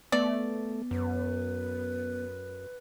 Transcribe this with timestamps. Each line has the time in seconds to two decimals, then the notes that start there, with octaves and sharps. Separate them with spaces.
0.12 A3 B3 D5
0.91 F#2 B4